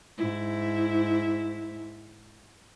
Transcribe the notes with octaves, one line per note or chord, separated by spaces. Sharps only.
G#2 E4